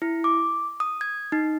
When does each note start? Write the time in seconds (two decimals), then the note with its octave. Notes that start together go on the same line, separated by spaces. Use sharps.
0.02 E4
0.24 D6
0.80 D#6
1.01 G#6
1.32 D#4